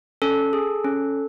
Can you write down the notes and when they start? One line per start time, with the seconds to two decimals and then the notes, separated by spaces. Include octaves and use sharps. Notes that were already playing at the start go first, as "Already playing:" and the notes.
0.22 C#4 A4
0.53 G#4
0.85 C#4